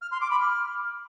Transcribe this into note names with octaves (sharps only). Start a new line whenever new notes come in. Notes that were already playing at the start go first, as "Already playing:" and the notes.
F6
C6
D6
B5
F6